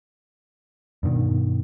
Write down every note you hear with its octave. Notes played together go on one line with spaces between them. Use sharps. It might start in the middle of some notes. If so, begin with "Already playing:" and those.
G2 B2 D#3